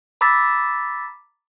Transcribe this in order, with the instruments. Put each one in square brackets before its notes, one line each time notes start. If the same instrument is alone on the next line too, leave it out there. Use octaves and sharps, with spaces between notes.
[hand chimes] A#5 B5 D6 E6 A6 B6